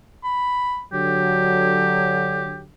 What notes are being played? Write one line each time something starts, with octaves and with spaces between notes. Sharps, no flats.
B5
D3 F#3 G4